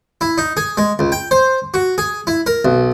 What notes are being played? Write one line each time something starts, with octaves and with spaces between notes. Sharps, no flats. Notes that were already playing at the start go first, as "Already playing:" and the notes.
E4
D#4
G#4
G#3
C#2
G5
C5
F#4
G#4
E4
A#4
B1